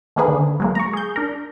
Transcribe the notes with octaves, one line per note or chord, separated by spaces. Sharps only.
D#3 A3 A#3 C4 G#4 B4
D3
F#3 G#3 A#3
A#5 C#6
G#4 G6
D4 A#4